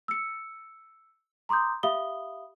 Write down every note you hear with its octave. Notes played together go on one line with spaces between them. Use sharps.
E6 C#7
A#5 C6 D6 D#6 G6
G4 E5 F5 B5 D#6 G7